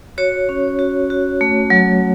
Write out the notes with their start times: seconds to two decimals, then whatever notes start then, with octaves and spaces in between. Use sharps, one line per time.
0.18 F#4 C#5
0.49 C#4
0.79 F#4
1.10 F#4
1.41 A3
1.70 F#3